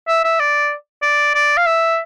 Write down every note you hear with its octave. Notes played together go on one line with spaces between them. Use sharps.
E5
E5
D5
D5
D5
F5
E5